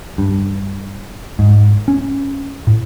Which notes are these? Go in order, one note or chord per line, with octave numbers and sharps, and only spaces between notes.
G2
G#2
C#4
A2